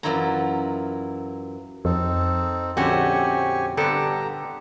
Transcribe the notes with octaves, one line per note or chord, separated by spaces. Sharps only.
F#2 E3 E4 F4 A#5
F2 C4 D#4 A4
A#1 D3 C4 C#4 F#4 G4 G#5 C#6
G2 D3 B3 G4 A4 G5 A#5